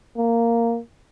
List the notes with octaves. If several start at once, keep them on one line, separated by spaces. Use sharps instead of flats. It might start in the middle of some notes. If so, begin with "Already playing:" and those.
A#3